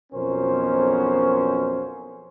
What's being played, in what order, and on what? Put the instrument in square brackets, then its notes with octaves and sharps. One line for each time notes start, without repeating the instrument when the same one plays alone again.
[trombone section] B1 F2 B2 C#4 A#4 C5